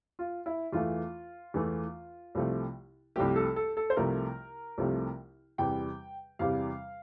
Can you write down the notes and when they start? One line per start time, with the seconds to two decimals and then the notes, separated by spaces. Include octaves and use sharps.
0.19 F4
0.46 E4
0.73 E2 E3 A3 F4
1.54 E2 E3 A3
2.35 C2 C3 F3 A3
3.16 C2 C3 F3 A3 G4
3.36 A4
3.56 A4
3.77 A4
3.90 C5
3.96 C2 C3 F3 A3 A#4
4.78 C2 C3 F3 A3
5.58 E2 C3 G3 G5
6.39 E2 C3 G3 F5